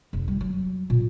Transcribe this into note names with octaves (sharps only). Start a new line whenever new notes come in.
F1
G3
F#3
A#2